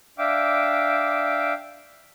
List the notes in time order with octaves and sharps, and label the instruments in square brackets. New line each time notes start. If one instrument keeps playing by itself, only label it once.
[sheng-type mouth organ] D4 E5 F5 G5 D6